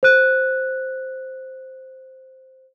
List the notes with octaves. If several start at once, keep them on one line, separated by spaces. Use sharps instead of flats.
C5 F#6